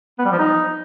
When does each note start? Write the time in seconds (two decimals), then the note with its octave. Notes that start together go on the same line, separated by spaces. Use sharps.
0.19 B3
0.26 G3
0.32 F3
0.39 D#4